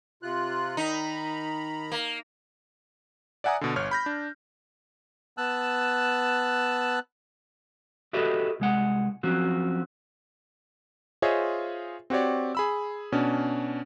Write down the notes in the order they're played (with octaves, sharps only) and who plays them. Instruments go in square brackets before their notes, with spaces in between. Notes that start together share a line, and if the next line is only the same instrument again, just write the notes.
[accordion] C3 F4 F#6
[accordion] D#3 A#5 B5 [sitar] D#4
[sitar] A#3
[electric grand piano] D5 E5 F#5 G#5 A#5 D#6
B2 D3
G1 C#5 F6
B5 G6 A#6
D4
[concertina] B3 A5 E6 F#6
[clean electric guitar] F#4 G4 A4 B4 D#5 E5
C2 G#3 F#5
F3 F#3 C4 C#4 F#4
[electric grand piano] F4 G#4 C5 C#5 D#5 E5
C4 F#4 G4 C#5 D5
G#4 B5 E6
B2 C#4 D4